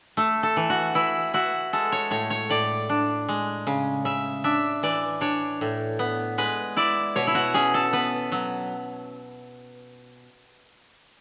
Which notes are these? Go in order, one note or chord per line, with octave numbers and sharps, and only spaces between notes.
A3 A4
A4
E3
F#4
E3 E4
E4 F#4
G#3 A4
C#5
A2 C#5
C#5
A2 D5
D4
G#3
C#3
C#3 E5
D4 E5
E3 D5
D4 C#5
A2
B3
G#3 B4
E4 D5
B2 C#5
E4
F#4
C#4 G#4
A4
B3 B4
F#3